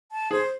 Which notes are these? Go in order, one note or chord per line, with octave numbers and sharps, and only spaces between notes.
A5
G#4 C5